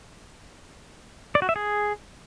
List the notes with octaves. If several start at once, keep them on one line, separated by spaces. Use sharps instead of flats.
D5
F#4
E5
G#4